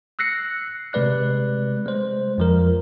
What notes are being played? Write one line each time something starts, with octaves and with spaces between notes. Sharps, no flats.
E6 F#6 A#6 C7 C#7
C3 G#3 B4 D5 F#6
G#3 C5
F2 F3 A#4